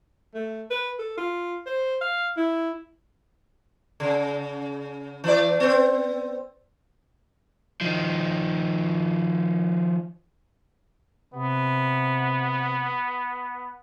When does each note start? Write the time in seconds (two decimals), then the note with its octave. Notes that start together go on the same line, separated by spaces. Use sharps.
0.34 A3
0.71 B4
0.99 A4
1.17 F4
1.66 C5
2.01 F5
2.37 E4
4.00 C#3
5.24 E3 D5
5.60 B3 C4
7.81 D#3 F3
11.34 C3 B3